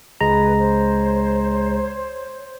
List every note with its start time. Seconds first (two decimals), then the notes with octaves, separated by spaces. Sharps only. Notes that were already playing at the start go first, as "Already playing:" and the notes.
0.21 C#2 G#3 B4 G#5 A#5
0.59 C5 C#5